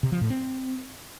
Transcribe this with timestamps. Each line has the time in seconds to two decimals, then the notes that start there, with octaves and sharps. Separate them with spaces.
0.03 C3
0.12 F3
0.21 A2
0.30 C4